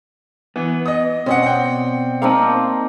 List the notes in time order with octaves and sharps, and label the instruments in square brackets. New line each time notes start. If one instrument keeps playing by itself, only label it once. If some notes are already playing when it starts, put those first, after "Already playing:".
[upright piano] E3 [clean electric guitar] B3
[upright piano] D#5 D#6
[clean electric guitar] B2 [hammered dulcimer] C4 D5 [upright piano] C#4 D#5 F#5
[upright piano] F#5 G5
[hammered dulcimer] A#3 C4 D#4 [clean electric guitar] F5 A5